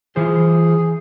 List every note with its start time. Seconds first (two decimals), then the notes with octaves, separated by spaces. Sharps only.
0.16 E3 F4 G#4 C5